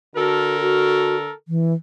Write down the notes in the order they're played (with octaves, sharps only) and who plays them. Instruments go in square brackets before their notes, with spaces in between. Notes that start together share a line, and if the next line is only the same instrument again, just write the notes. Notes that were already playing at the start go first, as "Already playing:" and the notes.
[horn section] D3 A4 A#4 [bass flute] F#4
[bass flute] F#4
E3